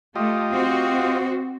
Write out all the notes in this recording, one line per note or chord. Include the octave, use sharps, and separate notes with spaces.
A3 F4 G4 D#5
C4 F#4